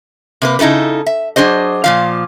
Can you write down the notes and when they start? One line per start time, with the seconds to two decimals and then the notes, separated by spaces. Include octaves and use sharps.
0.42 C3 A#3 B4
0.59 C#3 D#4 E4 A4 B4
1.06 E5
1.36 F#3 D4 G#4 C5 D#5
1.84 A#2 F3 F5